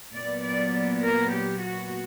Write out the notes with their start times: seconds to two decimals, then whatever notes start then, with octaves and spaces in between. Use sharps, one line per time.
0.14 A#2 F#3 B3 D5
0.44 D5
1.02 A#4
1.33 G4
1.62 F#4